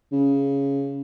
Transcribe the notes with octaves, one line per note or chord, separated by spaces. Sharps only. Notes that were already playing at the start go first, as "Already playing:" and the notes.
C#3